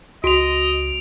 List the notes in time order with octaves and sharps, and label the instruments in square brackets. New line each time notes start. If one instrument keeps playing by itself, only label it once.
[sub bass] C#2 [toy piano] F#4 [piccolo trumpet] D#5 [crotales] D7 F7